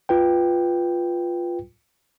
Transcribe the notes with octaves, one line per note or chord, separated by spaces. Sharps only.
F4 B4 G5